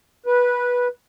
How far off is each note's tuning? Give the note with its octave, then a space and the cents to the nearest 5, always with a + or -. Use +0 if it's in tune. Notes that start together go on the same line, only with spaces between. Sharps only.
B4 -15